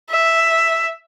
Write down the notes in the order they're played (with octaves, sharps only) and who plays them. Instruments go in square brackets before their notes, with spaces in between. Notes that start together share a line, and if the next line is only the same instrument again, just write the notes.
[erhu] E5